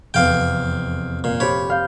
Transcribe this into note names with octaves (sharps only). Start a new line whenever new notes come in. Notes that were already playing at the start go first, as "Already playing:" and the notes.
F1 E2 F5 G5
A#2 F5
G4 C5 C#5 B5
F5 G6